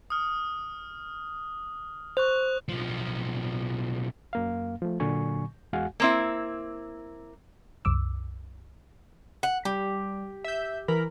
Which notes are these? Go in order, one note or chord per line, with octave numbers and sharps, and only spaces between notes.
D#6 F6
C5 C#6 F#6 F7
B1 F3
F#2 A#3 F5
F3 A3
A#2 D3 F#3 G#5 C#6
E2 G#3 F#4 F5 F#5 G#5
A#3 C4 E4
C2 F#2 D6 E6
F#5
G3 G4
E5 G6
E3 A#4 B5